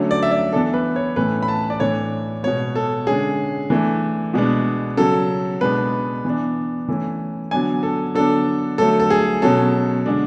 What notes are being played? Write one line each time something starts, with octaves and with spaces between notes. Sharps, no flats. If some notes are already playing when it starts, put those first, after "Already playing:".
Already playing: D3 F#3 A3 C#4
D5
E5
D5
E3 B3 D4 A4
B4
C#5
A2 E3 A3 C#4 B4
B5
A5
D5
A2 E3 A3 D4 C#5
B2 G#3 B3 C#5
A4
D3 G#3 C#4 G#4
E3 A3 D4
B2 G#3 B3 D4
C#3 F#3 C#4 A4
B2 G#3 B3 D4 B4
E3 B3 D4
E3 A3 C#4
D3 F#3 B3 D4 G#5
A4
D3 F#3 B3 D4 A4
D3 F#3 A3 A4
A4
G#4
B2 F#3 C#4 A4
D3 G#3 D4